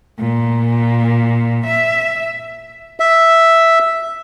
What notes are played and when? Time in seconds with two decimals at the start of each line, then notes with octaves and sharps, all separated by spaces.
0.19 A#2
1.65 E5
3.00 E5